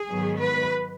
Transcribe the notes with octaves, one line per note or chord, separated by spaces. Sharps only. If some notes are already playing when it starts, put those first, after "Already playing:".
Already playing: G#4
G#2 D#3 F#3 B3
B4